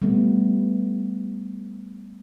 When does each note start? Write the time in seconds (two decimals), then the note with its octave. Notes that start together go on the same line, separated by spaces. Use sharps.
0.02 G3 A3 B3